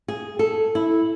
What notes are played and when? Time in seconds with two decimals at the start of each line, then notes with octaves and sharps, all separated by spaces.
0.08 G#4
0.39 A4
0.75 E4